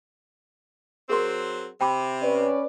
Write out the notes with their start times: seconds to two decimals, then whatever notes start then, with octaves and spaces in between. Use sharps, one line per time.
1.10 F#3 C4 G#4 A#4 C6
1.81 C3 G5 B5 D6
2.22 C#4 B4 D5